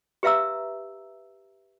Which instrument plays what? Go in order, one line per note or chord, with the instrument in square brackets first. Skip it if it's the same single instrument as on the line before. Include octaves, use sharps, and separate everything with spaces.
[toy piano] G4 B4 E5 F5 A#5 E6